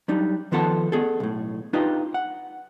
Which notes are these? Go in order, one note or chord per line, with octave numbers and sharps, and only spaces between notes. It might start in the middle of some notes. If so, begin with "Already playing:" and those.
F#3 G3 D4 D#4
D#3 F3 B3 A4 F#5 A5
B3 G#4 A4
B1 A2
D4 D#4 F4 G4 B4 D#5
F#5